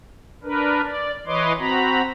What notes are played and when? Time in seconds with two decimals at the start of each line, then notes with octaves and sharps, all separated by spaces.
0.44 D4 A#4 B4
0.84 D5
1.26 E3 B4 C#5 D#5 C6 D6
1.59 C4 F#4 A#5 B5